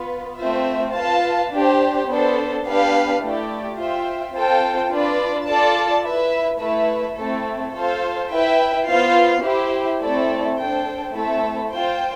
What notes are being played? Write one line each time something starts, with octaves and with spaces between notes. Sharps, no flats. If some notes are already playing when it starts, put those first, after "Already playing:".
Already playing: B3 F4 B4
A3 C4 F4 C5 E5
F4 B4 F5 A5
D4 G4 C5
B3 D4 A4 C5
B3 D4 G4 B4 F5
A3 E4 G4 D5
F4 C5 E5 G5
C4 F4 A4 C5 G5
D4 F4 B4 D5
F4 A4 D5 A5
E4 B4 E5
A3 E4 B4 E5
A3 C4 E4 A4
F4 A4 C5 F5
E4 B4 E5 G5
B3 F4 C5 F5
E4 G4 C5
A3 C4 E4 A4 D5
D4 A4 C5 G5
A3 C4 E4 A4 E5
F4 C5 G5